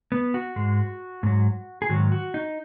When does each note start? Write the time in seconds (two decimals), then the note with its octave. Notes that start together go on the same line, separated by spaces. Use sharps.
0.12 B3
0.34 F#4
0.56 G#2 G#3
1.23 G#2 F#3
1.82 G#4
1.89 G#2 D#3 F#3 F#4
2.12 F#4
2.34 D#4